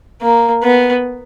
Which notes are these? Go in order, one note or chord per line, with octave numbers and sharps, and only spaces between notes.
A#3
B3